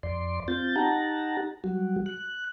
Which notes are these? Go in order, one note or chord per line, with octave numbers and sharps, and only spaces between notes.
F2 D5 C6
C4 F4 G6 A6
D#4 G4 F#5 A5 A#5
F#3 G3 F#4
F#6